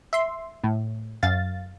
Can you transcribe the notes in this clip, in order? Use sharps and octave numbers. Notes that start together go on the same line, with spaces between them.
E5 C6
A2
F#2 F5 A6